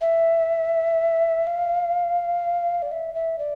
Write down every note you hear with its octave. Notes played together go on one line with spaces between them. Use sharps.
E5
F5
D5
E5
E5
D5